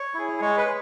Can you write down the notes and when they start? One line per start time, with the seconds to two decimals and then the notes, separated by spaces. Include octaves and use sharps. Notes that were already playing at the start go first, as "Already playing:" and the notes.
Already playing: C#5
0.14 E4 G#4
0.41 G#3 C#5
0.57 B4
0.66 G#4